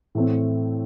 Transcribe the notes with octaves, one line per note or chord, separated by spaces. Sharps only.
A2 E3 A3 C4